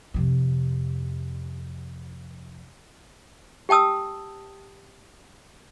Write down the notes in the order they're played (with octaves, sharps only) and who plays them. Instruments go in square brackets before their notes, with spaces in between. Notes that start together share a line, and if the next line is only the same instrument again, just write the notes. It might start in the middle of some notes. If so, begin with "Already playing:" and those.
[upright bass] F2 C3
[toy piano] G4 G5 A5 D#6 E6